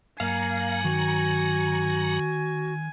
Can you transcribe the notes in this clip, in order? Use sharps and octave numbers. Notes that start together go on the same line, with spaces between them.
G2 F#3 A#3 F5 G#5 A#5
D#3 F#4